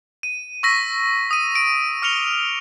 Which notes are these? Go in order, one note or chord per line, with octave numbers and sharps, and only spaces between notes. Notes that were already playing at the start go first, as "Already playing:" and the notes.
D#7
C#6 E6 A#6 B6
D#6 D#7
D7
D6 F6 C#7 F7 G7